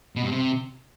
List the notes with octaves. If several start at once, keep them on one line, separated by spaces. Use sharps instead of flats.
B2
G2
C3